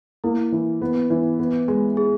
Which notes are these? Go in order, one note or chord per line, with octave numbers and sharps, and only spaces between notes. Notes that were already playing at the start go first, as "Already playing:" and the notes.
A#3 E4
E3
B3
E3
B3
G#3
G#4